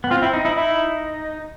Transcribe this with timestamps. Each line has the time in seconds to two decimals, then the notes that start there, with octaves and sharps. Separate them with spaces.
0.04 B3
0.11 C4 F4
0.22 C4 E4
0.33 D#4
0.45 D#4 E4
0.56 D#4 E4